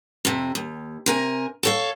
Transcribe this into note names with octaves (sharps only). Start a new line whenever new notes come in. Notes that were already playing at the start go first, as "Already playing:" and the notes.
F2 C3
D#2
C3 A#4 G#5
A4 C#5 F5